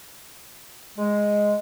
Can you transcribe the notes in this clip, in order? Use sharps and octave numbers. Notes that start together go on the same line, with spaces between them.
G#3